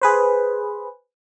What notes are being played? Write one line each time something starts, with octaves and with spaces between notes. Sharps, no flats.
G#4 B4 C5